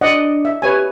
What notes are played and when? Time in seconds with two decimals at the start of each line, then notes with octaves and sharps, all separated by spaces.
0.01 D4 D5 D#5 F#5
0.45 E5
0.62 G4 B4 C#5 G#5